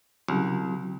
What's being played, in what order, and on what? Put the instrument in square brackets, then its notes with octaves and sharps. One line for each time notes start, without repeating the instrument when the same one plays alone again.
[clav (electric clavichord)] C2 [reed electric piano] C#3 F#3